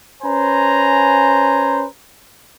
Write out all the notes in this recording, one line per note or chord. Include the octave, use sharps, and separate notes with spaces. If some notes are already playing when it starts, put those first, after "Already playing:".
C#4 B4 C5 G#5 A#5